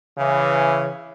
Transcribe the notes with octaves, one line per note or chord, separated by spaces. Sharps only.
C#3 E3